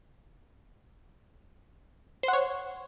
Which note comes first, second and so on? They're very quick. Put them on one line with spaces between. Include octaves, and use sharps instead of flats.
C5 F#5 C#5